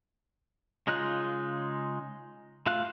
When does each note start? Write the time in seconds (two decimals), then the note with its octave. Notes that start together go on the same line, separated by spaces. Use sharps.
0.87 C#3 G#3 D#4 F4 F#6
2.66 A3 F4 F5 F#6